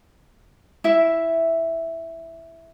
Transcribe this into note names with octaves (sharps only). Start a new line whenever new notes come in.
E4 E5